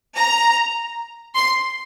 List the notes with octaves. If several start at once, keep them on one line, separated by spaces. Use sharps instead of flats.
A#5
C6